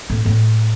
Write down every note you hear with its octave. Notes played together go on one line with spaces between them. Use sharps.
A2
A2